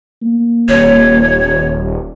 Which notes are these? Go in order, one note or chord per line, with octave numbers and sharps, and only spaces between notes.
A#3
D#1 C#5